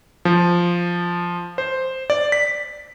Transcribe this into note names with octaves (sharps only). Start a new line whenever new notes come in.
F3
C5
D5
B6